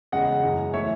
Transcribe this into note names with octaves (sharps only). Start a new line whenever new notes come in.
E2 C#3 G#3 D#5 F#5
F#2 E3 G#3
E3 A3 C#5 E5